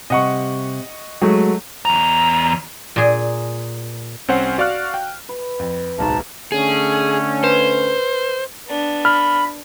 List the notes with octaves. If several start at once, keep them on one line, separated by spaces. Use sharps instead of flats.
C3 G3 D#5 F#5 C#6
F#3 G#3 A3 F#4
E2 A#5
A#2 G#4
C2 C4 C#4 C5 F#5 C7
F#4 D5 F5 C#6 F6 F#6
G5
B4
F2
D1 B1 G#2 D#4 A5 A#5
D3 A3 C#4 G#4
B4 C5
B3 D4
B5 F6